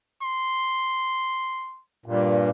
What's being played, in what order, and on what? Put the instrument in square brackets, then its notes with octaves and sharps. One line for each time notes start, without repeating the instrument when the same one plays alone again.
[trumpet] C6
[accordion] G2 A#2